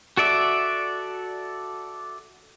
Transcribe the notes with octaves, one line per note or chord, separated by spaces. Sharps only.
F#4 A4 D5 E5